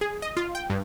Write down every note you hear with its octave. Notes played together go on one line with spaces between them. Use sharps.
G#4
D#5
F4
G5
G2